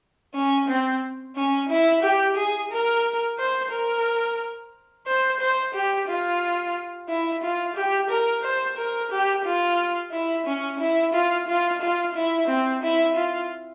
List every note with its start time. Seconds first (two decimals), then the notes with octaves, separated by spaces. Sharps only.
0.34 C#4
0.68 C4
1.35 C#4
1.69 E4
2.03 G4
2.36 G#4
2.71 A#4
3.38 C5
3.71 A#4
5.07 C5
5.40 C5
5.74 G4
6.08 F4
7.09 E4
7.43 F4
7.76 G4
8.10 A#4
8.43 C5
8.77 A#4
9.11 G4
9.45 F4
10.12 E4
10.46 C#4
10.80 E4
11.13 F4
11.48 F4
11.81 F4
12.15 E4
12.48 C4
12.83 E4
13.16 F4